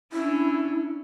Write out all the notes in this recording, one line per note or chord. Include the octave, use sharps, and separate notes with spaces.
C#4 D4 E4